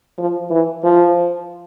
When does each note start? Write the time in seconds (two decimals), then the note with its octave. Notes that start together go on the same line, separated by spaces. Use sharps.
0.18 F3
0.50 E3
0.84 F3